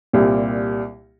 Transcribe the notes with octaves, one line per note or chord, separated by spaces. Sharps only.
C2 A#2 G3